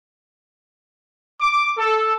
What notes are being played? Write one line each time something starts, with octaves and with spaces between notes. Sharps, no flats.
D6
A4